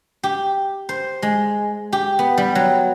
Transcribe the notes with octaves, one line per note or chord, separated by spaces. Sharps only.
G4
C5
G#3
G4
B3
G3
F#3